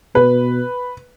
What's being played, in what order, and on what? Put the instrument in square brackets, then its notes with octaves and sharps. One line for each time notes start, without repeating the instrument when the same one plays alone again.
[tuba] B2 [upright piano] B4